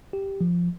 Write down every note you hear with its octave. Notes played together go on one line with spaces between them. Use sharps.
G4
F3